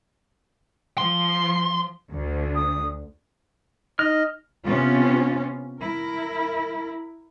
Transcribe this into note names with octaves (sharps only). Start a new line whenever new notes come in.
F3 C6
D2
D#6
D#4 D#5 F6
C3 B3 C#4 F4
E4 A#4